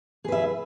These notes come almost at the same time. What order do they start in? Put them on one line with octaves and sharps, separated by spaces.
G#4 B4 E5